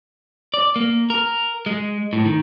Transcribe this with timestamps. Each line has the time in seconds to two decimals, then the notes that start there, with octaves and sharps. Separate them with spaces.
0.54 D5
0.76 A#3
1.10 A#4
1.66 G#3
2.13 A2
2.25 D#3